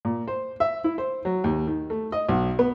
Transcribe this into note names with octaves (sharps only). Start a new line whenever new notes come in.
A#2
C5
E5
E4
C5
F#3
D#2
D#3
A3
D#5
B1
B3